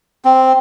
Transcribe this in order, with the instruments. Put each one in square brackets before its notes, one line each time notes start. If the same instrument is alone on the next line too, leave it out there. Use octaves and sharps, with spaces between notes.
[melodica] C4